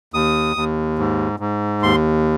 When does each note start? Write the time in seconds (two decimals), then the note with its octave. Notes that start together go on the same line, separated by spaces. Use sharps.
0.14 D#2 D#6
0.56 D#2
0.99 G#2
1.40 G#2
1.82 D#2 C6